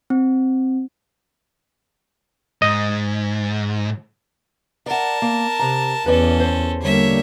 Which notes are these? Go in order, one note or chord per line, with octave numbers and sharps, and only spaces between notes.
C4
G#2 D#5
A#4 D5 F#5 A5
A#3
C3 A#5
E2 C#4 A4 B4 D5
C5
D3 G3 A#3 C#5 E5